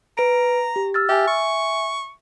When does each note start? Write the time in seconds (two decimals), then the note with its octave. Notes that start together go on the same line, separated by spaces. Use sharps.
0.18 B4 A#5 D7
0.76 G4
0.94 E6 F6 A6
1.09 G4 E5 G#5
1.27 C#6